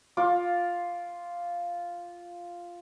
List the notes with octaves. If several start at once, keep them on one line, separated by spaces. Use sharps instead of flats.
F4 D6